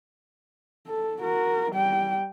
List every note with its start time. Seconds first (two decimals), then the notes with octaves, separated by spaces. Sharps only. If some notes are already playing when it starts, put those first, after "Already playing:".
0.88 A4
1.21 F#4 A#4
1.72 G3 G5